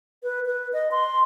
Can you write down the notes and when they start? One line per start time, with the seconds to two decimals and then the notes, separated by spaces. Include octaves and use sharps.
0.23 B4
0.46 B4
0.73 D#5
0.91 C6